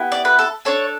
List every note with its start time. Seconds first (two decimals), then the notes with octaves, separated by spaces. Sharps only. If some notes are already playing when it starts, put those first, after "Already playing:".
Already playing: B3 E4 G4
0.12 D5
0.25 B4
0.39 A4
0.65 D4 A4 C#5